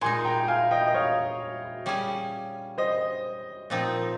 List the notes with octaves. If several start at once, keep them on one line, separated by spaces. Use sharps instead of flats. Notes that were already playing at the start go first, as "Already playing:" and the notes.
A#2 G#3 D#4 G#5 C6
G5 A#5
F5 G#5
D#5 G5
D#5
C#5 F5
G3 C#4 G#4
C5 D#5
A#2 F3 C4 D#4